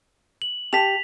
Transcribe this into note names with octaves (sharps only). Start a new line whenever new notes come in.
F#7
G4 A5 B6 F7